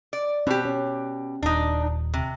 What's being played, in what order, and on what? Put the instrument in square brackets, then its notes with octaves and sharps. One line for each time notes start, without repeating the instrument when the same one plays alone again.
[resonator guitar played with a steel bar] D5
[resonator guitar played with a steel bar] B2 G4 [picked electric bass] C4
[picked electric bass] C#4
[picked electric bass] D#1 [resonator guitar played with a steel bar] D4 D#4
[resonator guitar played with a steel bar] C3